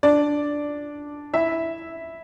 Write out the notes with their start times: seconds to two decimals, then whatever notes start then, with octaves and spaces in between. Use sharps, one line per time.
0.03 D4 D5
1.33 E4 E5